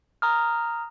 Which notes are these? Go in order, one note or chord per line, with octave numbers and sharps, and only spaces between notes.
A#5 D#6 F6